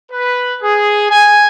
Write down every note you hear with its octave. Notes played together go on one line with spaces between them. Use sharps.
B4
G#4
G#5